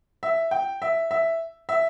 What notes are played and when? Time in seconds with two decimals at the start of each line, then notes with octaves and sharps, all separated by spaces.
0.23 E5
0.51 G5
0.82 E5
1.11 E5
1.69 E5